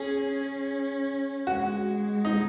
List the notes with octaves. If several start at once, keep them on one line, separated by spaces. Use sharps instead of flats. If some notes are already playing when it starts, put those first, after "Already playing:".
Already playing: C#4 G#4
C#4
G#3 F#4
D#4